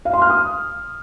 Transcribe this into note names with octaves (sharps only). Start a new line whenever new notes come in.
F5
C6
F6
D#6